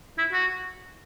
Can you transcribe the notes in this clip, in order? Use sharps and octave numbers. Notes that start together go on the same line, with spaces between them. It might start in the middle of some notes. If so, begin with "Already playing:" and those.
E4
F#4